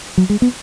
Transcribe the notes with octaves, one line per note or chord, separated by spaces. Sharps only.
F#3
G#3
B3